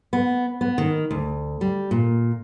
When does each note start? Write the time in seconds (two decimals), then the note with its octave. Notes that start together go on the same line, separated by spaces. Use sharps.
0.13 B3
0.61 B3
0.78 D#3
1.11 D2
1.61 G3
1.91 A#2